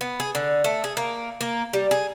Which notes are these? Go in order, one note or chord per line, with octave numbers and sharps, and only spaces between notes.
B3
G#4
D3
A3
G#4
A#3
A#3
G3
G#4